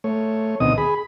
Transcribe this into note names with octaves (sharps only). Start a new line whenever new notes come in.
A3 C#5
D2 B2 D#3 C4 D#5 D#6
G#4 B5